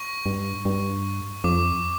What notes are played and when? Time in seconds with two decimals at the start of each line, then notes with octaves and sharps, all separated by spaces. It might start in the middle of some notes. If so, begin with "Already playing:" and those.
Already playing: C#6
0.26 G2
0.65 G2
1.44 F2 D6